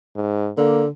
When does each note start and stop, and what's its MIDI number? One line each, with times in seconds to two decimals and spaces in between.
0.16 0.50 44
0.57 0.88 50
0.57 0.84 58